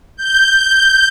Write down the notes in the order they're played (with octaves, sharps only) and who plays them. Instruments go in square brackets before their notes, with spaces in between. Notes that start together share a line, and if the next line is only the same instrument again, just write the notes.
[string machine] G6